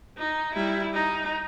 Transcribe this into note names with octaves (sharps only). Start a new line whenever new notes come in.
D#4
G3 E4
D#4